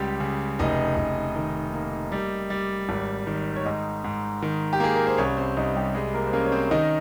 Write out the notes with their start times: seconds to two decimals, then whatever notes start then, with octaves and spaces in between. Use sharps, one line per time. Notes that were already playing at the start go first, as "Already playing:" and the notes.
Already playing: C#2 G3 G4
0.20 C#3
0.59 F1 D#4 D#5
0.97 F1
1.36 D#3
1.74 A#3
2.12 G3
2.50 G3
2.89 G#1
3.27 D#3
3.56 C#5
3.65 G#2 D#4 D#5
4.04 G#2
4.42 D#3
4.73 G4
4.80 A#3 G#4
4.96 A#4
5.07 C5
5.18 C2 C#4 C#5
5.37 C4 C5
5.57 C2 D#4
5.75 G3 G4
5.95 G3 G#3 G#4
6.14 A#3 A#4
6.26 C5
6.33 A#3 C#4 A#4
6.46 C#5
6.52 C4 C5
6.71 D#3 D#4 D#5